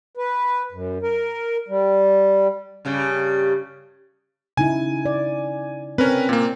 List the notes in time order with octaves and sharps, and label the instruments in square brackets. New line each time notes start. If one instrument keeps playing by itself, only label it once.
[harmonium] B4
F#2
A#4
G3
[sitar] G2 C#3 G3
[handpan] C#3 D#4 E4 [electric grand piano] G#5
[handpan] D5
[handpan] C4 [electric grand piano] C#4 A#4 B4
[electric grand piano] A#2 A#3